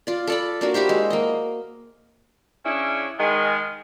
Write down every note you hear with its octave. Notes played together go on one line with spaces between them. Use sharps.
F4 D5
A4 D5 B5
A#3 D4 F#4
E4 F#4 G4 C5
G#3
A#3 D#5
C#3 C#4 D4 E4
D#3 G#3